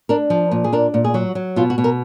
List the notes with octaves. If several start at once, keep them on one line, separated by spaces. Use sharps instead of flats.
D4 A#4
F3
A#2
G#4
D4 A#4
A#2
G#4
F#3 F#4
F#3
B2 F4
F#4
B2
A#4